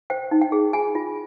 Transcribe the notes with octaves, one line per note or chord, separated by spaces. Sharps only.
C5 G5
D#4
G5
G#4
F4 G#5
F4